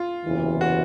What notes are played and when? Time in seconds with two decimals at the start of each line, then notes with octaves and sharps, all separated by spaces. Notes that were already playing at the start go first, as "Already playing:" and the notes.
Already playing: F4
0.24 F#1 E2 C3 E3
0.61 F#4